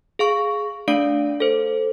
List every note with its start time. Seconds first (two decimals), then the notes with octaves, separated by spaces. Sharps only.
0.19 G#4 F5 C#6
0.88 A3 D4 D5 F5 D7
1.40 A4 C5